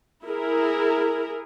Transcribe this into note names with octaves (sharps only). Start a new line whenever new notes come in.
E4 G#4 A#4